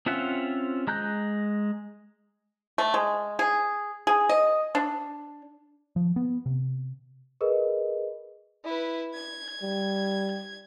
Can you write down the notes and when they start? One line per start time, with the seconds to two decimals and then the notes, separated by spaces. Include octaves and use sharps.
0.06 C4 C#4 F4 E5 F#5
0.87 G#3 A#5 F#6 G6
2.78 A3
2.94 G#3
3.39 G#4
4.07 G#4
4.29 D#5
4.75 D4
5.96 F3
6.16 B3
6.46 C3
7.41 G#4 A#4 B4 D#5
8.64 E4 B4
9.14 G#6
9.62 G3